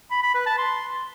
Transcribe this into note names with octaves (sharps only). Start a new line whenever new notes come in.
B5
B5
B4
A5
C6